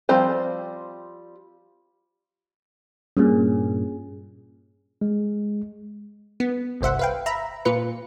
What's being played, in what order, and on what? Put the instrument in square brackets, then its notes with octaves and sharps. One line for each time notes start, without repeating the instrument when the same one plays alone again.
[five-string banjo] F3 G3 C4 C5
[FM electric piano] G2 A#2 [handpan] C#4 G#4
[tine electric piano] G#3
[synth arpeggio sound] B3
G1 C2 C5 E5 F#5
B4 F5 G5
E5 A#5 B5
A#2 F4 B4 C#7